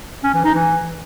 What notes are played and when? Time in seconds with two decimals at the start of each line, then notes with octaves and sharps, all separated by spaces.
0.24 C#4
0.34 E3
0.45 D#4
0.55 E3